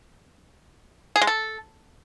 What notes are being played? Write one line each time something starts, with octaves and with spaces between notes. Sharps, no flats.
G#4
G#3
A4